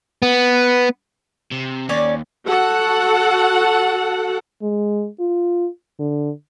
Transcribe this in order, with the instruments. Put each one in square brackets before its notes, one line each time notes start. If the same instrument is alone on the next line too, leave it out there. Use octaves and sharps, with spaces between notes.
[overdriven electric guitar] B3
C3
[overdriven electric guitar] D#2 [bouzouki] C#4 C#5 D5
[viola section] F#4 A4 F#5
[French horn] G#3
F4
D3